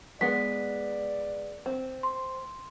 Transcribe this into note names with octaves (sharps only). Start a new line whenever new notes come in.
G#3 B3 D5 B6
C4
C6